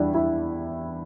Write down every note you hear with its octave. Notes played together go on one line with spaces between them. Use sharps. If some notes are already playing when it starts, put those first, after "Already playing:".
Already playing: E2 G3 D4 E4
E4